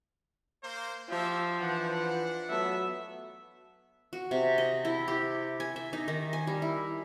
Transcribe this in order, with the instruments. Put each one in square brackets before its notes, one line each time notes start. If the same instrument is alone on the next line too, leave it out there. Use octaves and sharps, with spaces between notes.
[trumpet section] A#3 C5
[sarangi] F3 [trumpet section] G4 E5
[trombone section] E3 [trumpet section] D4 F#5
[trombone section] F#3 A3 B3 [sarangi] E5
[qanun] F#4
C3
D#5
E4
G4
G#5
E5
D#4
D#3
G#5
G3
E4